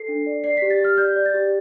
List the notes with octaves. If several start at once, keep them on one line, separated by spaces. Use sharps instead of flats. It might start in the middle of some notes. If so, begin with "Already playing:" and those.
Already playing: A4 C7
D4
D5
D5 C7
G4 B6
A6
G4 F6
D5 G6
D5
A6
G4